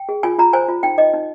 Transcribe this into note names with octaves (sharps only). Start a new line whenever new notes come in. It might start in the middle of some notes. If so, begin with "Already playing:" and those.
Already playing: G5
G#4
F4 G#5
F4 A#5
C5 G#5
F4
D#4 G5
D#4 D#5
D#4